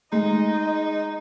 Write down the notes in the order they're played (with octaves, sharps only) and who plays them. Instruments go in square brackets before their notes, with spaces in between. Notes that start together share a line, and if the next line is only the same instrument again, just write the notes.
[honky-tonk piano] G#3 [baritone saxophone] D#4 [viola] D#5